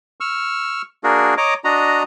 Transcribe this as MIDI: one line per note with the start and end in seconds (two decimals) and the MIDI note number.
0.20 0.82 85
0.20 0.82 88
0.20 0.82 89
1.04 1.34 58
1.04 1.34 62
1.04 1.34 66
1.04 1.34 68
1.04 1.34 70
1.37 1.54 73
1.37 1.54 75
1.37 1.54 82
1.37 1.54 86
1.64 2.03 62
1.64 2.03 66
1.64 2.03 75
1.64 2.03 82